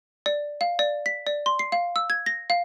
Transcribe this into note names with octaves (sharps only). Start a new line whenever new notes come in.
D5
F5
D5
B6
D5
C6
C7
F5
E6
G#6
A#6
F5